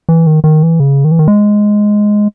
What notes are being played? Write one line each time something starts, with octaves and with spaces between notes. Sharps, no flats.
E3
D#3
D#3
E3
C#3
D#3
E3
D#3
G#3